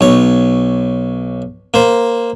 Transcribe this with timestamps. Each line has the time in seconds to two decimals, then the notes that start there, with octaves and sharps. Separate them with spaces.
0.01 B1 C#5
1.74 A#3 C5